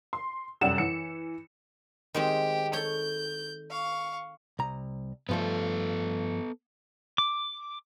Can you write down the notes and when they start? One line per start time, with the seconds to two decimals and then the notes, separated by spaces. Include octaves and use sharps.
0.13 C6
0.61 F1 F#2 G3 F#5 E7
0.78 E3 C#7
2.14 D#3 G#3 C4 G4
2.73 A4 C#5 G6
3.70 F5 C#6
4.59 C2 A#5
5.29 G2 F3 A3 B3 A4
7.18 D6